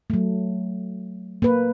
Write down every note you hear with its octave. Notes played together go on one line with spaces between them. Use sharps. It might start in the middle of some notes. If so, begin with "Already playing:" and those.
F#3 A3
A#3 B4